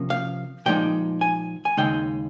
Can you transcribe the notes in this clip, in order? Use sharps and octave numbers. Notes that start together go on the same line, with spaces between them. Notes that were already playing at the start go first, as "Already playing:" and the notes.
Already playing: C3 F3 A#3 C#4
F5
A#2 F3 G#3 D#4 G5
G#5
G#5
D#2 C#3 G#3 D#4 G5